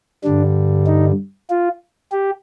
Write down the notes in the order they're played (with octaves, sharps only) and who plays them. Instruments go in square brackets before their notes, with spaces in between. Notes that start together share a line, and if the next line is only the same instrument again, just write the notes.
[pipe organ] G2 D3 G3 D4
D#4
F4
G4